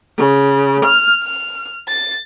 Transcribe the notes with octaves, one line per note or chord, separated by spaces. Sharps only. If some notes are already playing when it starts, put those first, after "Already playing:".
C#3
F6
F6
A6